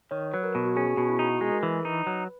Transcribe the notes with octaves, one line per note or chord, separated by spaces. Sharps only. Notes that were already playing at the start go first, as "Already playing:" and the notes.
D#3 C#5
F#3 B4
A#4
B2 F#4
F#4
C#4 G#4
G#4
B2 F#4
E4
D#4 F#4
G#3 G#4
A#4
E3 B4
D#4
F#3